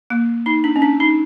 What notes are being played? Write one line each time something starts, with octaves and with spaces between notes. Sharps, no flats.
A#3
D#4
D4
C#4
D4
D#4